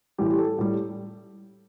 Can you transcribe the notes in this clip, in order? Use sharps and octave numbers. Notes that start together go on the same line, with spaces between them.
A2 E3 G3 G4
G4
A4
A2 G3